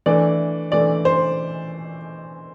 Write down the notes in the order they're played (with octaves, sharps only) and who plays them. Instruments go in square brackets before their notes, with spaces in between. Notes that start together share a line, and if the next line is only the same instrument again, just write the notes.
[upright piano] E3 A3 D4 D5
E3 A3 D4 D5
C5